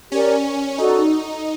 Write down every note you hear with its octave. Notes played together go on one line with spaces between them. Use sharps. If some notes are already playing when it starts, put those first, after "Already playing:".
C#4 G4 A#4 D5
D#4 F#4 A4 D5